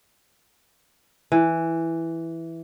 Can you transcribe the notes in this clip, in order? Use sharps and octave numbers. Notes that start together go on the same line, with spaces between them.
E3